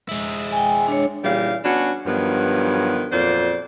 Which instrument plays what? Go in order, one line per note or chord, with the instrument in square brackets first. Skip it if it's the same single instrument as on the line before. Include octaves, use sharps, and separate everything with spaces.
[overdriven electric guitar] G#3 E4
[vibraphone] G5 G#5
D4 C#5
[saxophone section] A#2 C#3 E3 G3 F5
B3 C#4 D4 F#4
G2 D#3 F3 F#3 B3
F2 A#2 F#3 C5 D5